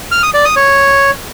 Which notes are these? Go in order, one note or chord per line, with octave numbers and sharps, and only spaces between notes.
F6
D#6
D5
D#6
C#5